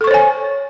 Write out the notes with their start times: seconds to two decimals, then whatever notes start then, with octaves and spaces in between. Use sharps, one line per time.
0.01 A4
0.04 C#6
0.07 C5
0.11 C#5
0.14 G#5